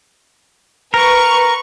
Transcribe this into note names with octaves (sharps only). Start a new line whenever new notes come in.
A#4 B4 C#6